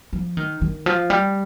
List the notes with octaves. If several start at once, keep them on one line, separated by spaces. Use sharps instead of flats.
F3
D#3
D#3
F3
G3